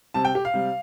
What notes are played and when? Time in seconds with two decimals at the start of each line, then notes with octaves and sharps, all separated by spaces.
0.14 C3 G3 A5
0.25 G5
0.35 G4
0.45 F5
0.54 C3 G3